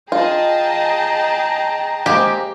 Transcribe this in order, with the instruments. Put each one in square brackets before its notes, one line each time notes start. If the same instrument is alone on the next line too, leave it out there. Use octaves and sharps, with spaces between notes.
[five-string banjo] F4 [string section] G#4 D#5 A5 [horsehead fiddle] G5 A#5
[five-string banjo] G#3 A#3 C4 [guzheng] G4